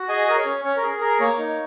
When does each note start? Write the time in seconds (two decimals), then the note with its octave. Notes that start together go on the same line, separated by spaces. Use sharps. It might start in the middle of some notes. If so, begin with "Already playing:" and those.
Already playing: F#4
0.09 G#4 D#5 G#5
0.28 G#4 A#4
0.37 C#5
0.46 C#4
0.64 C#4 C#5
0.76 A#4
0.83 G#4
1.00 G#4 A#4
1.20 A#3 C#5
1.38 D#4